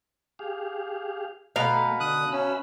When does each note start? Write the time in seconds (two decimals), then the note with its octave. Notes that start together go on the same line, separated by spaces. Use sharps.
0.39 G4 G#4 F5
1.56 B2 A3 B4 F5 F#5 A#5
2.00 D3 D#6 F#6
2.32 C#4 E5 B5